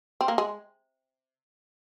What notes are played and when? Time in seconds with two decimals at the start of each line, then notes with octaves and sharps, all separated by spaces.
0.21 C4
0.28 A#3
0.38 G#3